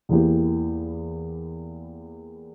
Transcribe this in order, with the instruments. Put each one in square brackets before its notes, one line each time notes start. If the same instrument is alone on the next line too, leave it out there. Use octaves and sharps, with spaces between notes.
[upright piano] E2 E3 A#3 E4 G4